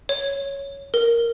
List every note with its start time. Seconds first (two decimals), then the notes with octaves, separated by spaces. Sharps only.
0.09 C#5
0.94 A#4